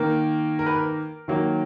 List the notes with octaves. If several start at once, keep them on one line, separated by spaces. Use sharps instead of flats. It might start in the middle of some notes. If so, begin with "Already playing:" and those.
Already playing: D#3 A#3 A#4
A#4
B4
A#4
D#3 F#3 A#3